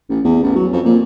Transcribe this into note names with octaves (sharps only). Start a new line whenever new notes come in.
A1
E2
A1
F#3
F2
A#2